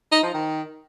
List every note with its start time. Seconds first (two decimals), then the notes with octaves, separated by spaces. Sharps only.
0.12 D#4
0.23 F3
0.34 D#3